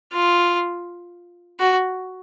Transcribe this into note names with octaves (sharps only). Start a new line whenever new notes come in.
F4
F#4